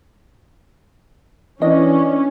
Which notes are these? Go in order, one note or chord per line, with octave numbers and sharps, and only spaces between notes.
E3 C#4 D4 D#5